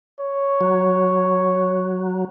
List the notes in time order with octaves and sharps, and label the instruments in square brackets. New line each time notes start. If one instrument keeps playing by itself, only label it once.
[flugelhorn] C#5
[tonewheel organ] F#3